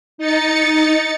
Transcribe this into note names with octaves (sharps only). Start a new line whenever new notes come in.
D#4 A6 C#7